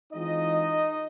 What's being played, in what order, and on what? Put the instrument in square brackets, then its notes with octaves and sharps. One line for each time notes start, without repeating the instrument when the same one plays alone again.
[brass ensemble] E3 G#3 C4 D#4 F4 D#5